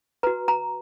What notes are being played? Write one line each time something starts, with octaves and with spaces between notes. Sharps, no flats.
F#4 B4 A#5
A#5